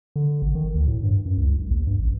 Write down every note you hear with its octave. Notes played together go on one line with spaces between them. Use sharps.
D3
G#1
D#3
D2
A2
G2
F#2
C#2
B1
D#2
G2
A1